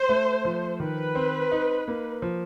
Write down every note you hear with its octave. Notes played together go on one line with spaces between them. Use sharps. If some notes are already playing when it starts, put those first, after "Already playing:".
Already playing: C5
A3
F3
D#3 B4
C4
D#4
A#3
F3